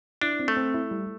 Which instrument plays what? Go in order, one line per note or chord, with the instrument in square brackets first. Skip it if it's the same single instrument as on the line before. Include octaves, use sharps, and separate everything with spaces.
[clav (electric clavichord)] D4 [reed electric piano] E4
[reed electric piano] C4
[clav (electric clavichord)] A3
[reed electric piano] C4
E4
G3